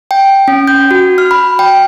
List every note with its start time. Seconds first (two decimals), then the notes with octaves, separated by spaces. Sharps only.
0.11 G5
0.48 C#4
0.67 G6
0.91 F#4
1.18 F6
1.31 B5
1.59 G5